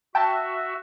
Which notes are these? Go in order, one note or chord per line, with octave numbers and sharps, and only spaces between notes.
F#4 E5 G5 A5